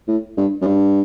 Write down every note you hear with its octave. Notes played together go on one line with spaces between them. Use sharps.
A2
G2
F#2
G2